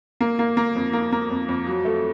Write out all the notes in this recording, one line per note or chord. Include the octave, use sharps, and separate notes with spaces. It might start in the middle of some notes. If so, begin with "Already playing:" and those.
A#3
A#3
A#3
F2
A#3
A#3
F2
F2
F#3
A3